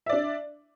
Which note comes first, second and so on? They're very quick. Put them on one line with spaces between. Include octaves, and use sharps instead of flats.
E5 D5 D4